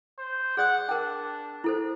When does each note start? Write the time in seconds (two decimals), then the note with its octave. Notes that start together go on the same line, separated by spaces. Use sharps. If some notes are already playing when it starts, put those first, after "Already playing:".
0.18 C5
0.57 G#4 D5 F#5 D#6
0.89 D4 A#4 G5
1.64 E4 A4 C5